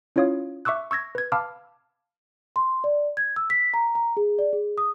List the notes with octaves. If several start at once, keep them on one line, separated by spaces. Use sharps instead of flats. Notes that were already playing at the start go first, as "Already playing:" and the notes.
C#4 E4 F4 C#5 F5 D#6
E5 C#6 D6 E6 F#6
C#6 E6 G#6 A#6
B4 G#6
F5 A5 B5 D6 E6 F6
C6
D5
G#6
E6
B6
A#5
A#5
G#4
D5
G#4
D#6